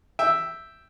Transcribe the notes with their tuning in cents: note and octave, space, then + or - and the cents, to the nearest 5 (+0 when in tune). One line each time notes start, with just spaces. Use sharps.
E5 +0 G5 +0